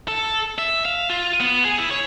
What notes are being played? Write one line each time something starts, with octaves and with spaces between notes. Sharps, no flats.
A4
E5
F5
F4
B3
G#4
E4
C#5